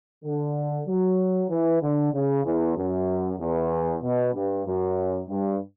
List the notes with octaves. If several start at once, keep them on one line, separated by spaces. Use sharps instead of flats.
D3
F#3
E3
D3
C#3
E2
F#2
E2
B2
G2
F#2
G2